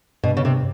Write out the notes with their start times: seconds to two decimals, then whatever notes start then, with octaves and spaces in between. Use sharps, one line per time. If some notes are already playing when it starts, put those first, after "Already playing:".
0.23 G2 B2
0.37 C#3
0.45 C3